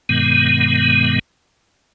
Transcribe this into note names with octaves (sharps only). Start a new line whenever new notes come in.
G2 B2 D#3 G#3 B3